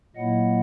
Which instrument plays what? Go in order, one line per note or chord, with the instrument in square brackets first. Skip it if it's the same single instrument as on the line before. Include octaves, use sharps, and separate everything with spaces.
[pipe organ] A#2 F#3 A#3 E4 D#5 F#5